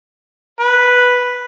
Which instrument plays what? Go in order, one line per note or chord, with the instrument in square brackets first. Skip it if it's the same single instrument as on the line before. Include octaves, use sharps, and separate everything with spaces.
[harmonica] B4